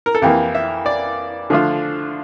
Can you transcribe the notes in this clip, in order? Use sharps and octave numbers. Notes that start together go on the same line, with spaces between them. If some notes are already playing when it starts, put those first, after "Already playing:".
A#4
A4
F2 E3 A#3 G4
E5
D5
D3 F3 A3 D4 F4